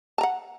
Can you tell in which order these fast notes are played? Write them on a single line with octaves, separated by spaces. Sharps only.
A5 A#5 F#5